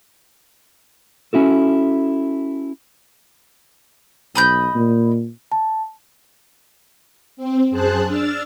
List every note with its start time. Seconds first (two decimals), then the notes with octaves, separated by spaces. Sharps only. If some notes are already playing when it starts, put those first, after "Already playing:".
1.33 C#4 E4 F#4 A4
4.35 B1 D#5 B5 G6
4.75 A#2
5.52 A5
7.37 C4
7.71 F#2 G#4 C5 A5 F#6
8.05 D4 E6 F6 A6